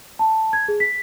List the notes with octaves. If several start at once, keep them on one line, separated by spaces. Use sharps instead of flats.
A5
G#6
G#4
B6